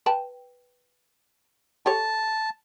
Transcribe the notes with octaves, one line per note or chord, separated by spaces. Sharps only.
B4 G5 A5
G4 A4 C#5 A5